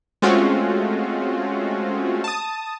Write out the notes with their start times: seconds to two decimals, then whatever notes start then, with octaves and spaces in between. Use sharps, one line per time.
0.22 G#3 A3 C4 C#4 F4 F#4
2.24 A5 D#6